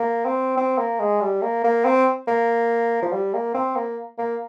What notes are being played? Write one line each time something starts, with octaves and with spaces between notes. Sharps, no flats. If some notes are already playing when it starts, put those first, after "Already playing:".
Already playing: A#3
C4
C4
A#3
G#3
G3
A#3
A#3
C4
A#3
F3
G3
A#3
C4
A#3
A#3